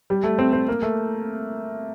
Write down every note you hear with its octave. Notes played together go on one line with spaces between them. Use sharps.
G3
A3
C4
C4
A#3
A3